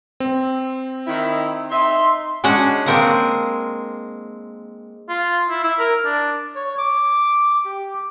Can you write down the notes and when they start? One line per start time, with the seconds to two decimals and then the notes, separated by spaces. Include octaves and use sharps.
0.20 C4
1.07 D#3 E4
1.71 D#4 E5 C6
2.44 G#3 C#4 D4 F#4 F#5
2.86 G#3 A#3 C4 A#4 F5 F#5
5.09 F4
5.50 E4
5.63 E4
5.79 A#4
6.05 D4
6.55 C#5
6.78 D6
7.65 G4